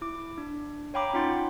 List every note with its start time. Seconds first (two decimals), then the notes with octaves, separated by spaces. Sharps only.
0.01 E4 D6
0.38 D4
0.94 C#5 F5 G5 A#5 B5 D6
1.14 C#4 D#4 F4 F#5 C6 A6